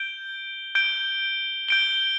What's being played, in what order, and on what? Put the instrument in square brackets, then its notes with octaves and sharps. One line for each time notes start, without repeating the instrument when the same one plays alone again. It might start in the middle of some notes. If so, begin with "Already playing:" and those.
Already playing: [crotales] G6 D7 G7
G6 D7 G7
G6 D7 G7